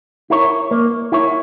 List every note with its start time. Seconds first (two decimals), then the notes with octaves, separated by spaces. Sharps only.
0.30 E4 A#4 C#5
0.71 A#3
1.12 E4 A#4 C#5